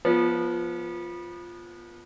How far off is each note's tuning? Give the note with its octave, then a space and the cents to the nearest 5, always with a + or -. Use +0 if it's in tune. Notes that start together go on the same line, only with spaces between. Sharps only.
F3 +0 B3 -25